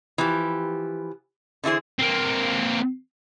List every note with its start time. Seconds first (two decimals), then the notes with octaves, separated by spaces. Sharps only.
0.18 E3 F3 G4
1.64 D3 E3 E4 G#4 C5
1.99 A#3 C4